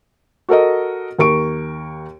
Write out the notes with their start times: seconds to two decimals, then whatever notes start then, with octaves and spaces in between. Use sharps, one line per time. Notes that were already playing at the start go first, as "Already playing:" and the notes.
0.49 F#4 A4 A#4 D#5
1.19 D#2 A#4 C#6 D7